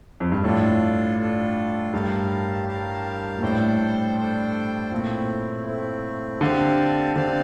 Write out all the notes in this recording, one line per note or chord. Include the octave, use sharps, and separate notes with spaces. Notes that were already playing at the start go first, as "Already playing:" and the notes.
F2
G2
A2 D4 F4 A4
D4 F4 A4
G2 G4 A#4 F5 A5
G4 A#4 F5 A5
A#2
A2 D4 A4 C5 G5
D4 A4 C5 G5
A#2 A3 C4 E4
A3 C4 E4
D3 C4 G4 D5 F5 A5
D3 C4 G4 D5 F5 A5